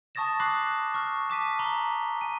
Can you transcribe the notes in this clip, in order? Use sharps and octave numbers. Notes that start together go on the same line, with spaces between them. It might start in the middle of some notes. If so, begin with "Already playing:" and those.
A5 C#6 D#6 A6 A#6 E7
B5 D6 F#6 C7
C#6 F6
A5 D6 B6 D#7
A#5 B5 G7
G#5 D#7